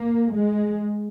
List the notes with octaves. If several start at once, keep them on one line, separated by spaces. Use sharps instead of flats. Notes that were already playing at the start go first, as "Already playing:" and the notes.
Already playing: A#3
G#3